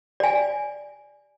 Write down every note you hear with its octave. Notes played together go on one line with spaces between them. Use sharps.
D5 G#5